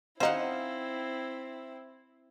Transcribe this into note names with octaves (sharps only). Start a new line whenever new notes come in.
C4 C#4 D#4 E4 C5 F5 F#5